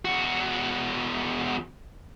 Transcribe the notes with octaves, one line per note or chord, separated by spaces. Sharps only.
E2 F#4